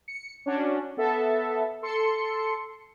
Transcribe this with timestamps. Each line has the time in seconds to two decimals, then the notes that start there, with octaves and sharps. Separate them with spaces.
0.08 C#7
0.46 C#4 D4 F#4
0.97 B3 A4 E5 A5
1.82 A4 C6 C#7